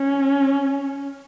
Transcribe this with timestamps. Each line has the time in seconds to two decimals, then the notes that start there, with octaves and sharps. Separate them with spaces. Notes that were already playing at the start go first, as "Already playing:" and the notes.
Already playing: C#4